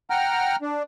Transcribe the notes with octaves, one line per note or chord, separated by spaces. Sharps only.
F#5 G5 A#5 F6
D4